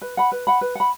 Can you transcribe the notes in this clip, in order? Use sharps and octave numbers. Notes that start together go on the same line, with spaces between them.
B4
F#5 B5
B4
F#5 B5
B4
F#5 B5